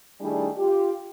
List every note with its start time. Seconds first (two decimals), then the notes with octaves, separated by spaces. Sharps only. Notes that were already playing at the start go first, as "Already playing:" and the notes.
0.20 D#3 G3 A3 D4 E4 G#4
0.57 F4 G4